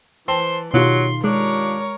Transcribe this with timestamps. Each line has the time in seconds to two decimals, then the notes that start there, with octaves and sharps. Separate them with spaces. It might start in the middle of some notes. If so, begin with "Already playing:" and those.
0.28 E3 C5 A5
0.74 B2 D#3 F#3 F4 G4 C6
1.24 G#3 D4 A#4 C#5